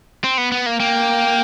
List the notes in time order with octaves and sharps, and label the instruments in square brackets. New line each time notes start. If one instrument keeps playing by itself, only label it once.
[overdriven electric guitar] C4
B3
B3
A#3
[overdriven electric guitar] A#3 [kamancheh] G5